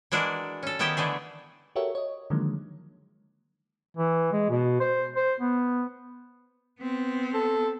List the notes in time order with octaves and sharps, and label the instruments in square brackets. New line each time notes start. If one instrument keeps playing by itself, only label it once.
[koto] E3 G#3 D4 F#4 A#4
C#4 A4
D#3 B3 E4 G4 G5 A5
D3 E3 A3 G#4
[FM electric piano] F#4 G4 A4 A#4 C#5 E5
C#5 D#5
D3 D#3 F3 F#3 G#3 A#3
[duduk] E3
G#3
B2
C5
C5
B3
[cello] B3 C4
[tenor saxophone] A4